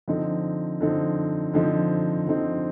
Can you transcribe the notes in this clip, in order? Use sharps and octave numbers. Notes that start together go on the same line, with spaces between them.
D3 F3 C4 D#4
D3 F3 C4 D#4
D3 F3 C4 D#4
D3 F3 C4 D#4